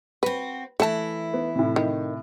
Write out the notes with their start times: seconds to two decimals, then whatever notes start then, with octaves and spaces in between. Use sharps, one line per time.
0.23 C4 F#4 B4
0.80 E3 A3 E4 A5
1.34 B3
1.55 A2 C3
1.76 D#3